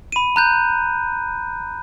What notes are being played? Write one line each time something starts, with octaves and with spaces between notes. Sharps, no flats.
B5 D#7
A#5 F#6 G6